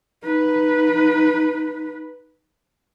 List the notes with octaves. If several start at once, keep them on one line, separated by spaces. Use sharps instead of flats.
D#4 B4